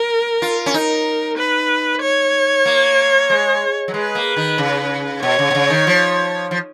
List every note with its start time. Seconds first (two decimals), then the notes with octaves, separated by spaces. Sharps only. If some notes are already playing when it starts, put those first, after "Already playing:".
Already playing: A#4
0.42 F4
0.66 C#4
0.74 D#4 A#4
1.37 B4
2.02 C#5
2.66 A#3
3.30 G#3
3.88 F#3
3.94 G#3 B4
4.15 A#3
4.36 D#3
4.58 C#3
5.22 B2 C#5
5.39 C#3
5.51 B2
5.55 C#3
5.70 D#3
5.87 F3
6.51 F3